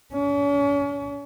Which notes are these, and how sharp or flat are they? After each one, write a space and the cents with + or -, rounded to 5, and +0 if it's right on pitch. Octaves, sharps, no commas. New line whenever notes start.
C#4 +40